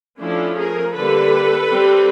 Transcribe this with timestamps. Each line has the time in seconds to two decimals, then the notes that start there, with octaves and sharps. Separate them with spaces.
0.19 F3 A3 C#4 D4 E4
0.57 G#4 A#4
0.94 D3 G3 A#3 A4 B4
1.70 G3 C4